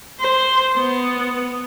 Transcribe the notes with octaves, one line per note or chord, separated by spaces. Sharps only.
C5
B3